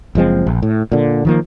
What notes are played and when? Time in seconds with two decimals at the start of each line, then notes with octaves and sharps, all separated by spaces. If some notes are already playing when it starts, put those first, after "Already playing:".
0.15 F#1 F3 G#3 C4
0.47 A#1
0.62 A2
0.92 A#2 D3
1.25 D#3 F3 A#3